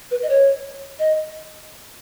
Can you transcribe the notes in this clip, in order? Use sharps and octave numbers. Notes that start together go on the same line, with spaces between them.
B4
D#5
C#5
D#5